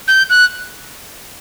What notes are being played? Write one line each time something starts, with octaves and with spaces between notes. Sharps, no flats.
G6
F#6